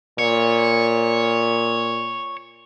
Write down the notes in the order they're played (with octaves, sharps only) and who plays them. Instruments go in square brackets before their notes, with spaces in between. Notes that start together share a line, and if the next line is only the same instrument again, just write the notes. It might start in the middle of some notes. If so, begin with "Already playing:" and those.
[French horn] A#2 [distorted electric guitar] C#5